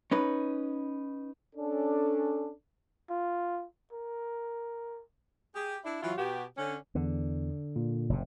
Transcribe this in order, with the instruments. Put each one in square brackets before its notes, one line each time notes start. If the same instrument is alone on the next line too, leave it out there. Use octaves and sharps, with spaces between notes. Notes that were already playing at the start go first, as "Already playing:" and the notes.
[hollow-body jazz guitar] C#4 D#4 B4
[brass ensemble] C#4 D4 A4
[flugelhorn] F4
A#4
[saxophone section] G4 G#4
D4 E4
E3 F#3 E4 F4
B2 B3 F#4 G4
D3 C#4
[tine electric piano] E2 [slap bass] D3
[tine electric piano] A#2
[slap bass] F#1 C3